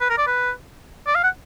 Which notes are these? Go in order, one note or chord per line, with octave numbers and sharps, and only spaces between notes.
B4
A#4
D5
B4
D5
F5
F#5